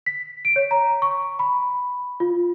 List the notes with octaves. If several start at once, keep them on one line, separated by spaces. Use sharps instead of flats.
B6
D7
C#5
A#5
C#6
B5
F4